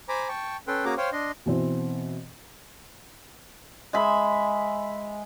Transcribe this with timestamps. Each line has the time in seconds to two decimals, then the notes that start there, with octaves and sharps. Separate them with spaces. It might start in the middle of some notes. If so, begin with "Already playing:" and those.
0.09 C5 G#5 A#5 B5 D6
0.28 G5 A5 C#6
0.68 C#4 A4 B4 G5 C6
0.85 A#3 C#4 F#4 G#4 A#5 D6
0.98 C5 C#5 F5 G5 C6
1.13 D4 D#5 C6
1.46 B2 E3 C4
3.93 G#3 E5 B5